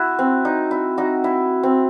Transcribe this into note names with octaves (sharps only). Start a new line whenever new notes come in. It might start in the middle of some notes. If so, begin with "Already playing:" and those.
Already playing: E4 F#4
C4
D#4
E4
D#4 F#4
E4
C4